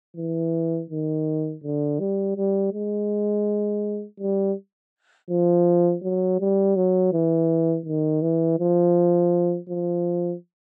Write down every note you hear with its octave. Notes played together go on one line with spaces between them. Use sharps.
E3
D#3
D3
G3
G3
G#3
G3
F3
F#3
G3
F#3
E3
D#3
E3
F3
F3